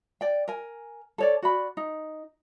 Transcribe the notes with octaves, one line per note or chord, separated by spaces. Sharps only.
D5 G5
A#4 G#5
A4 C#5 D5
F#4 D5 B5
D#4